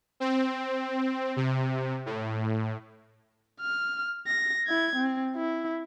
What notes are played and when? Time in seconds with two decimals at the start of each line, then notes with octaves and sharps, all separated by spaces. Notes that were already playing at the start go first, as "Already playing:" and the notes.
0.20 C4
1.36 C3
2.06 A2
3.61 F6
4.27 A#6
4.67 E4 G#6
4.96 C4
5.36 E4